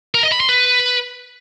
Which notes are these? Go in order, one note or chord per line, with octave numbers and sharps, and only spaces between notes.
A#4
D#5
B5
C6
B4